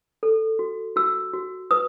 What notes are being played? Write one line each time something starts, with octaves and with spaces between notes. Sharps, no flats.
A4
F#4
F#4 E6
F#4
B4 D#6